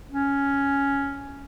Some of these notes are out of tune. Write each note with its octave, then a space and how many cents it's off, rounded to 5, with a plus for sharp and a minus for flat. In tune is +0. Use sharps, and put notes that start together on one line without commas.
C#4 +5